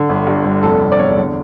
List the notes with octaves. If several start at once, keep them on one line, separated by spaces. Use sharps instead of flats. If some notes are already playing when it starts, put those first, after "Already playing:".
Already playing: D3
G1
G2
G1
F1 A4
F1
D5
E2 C#5
D3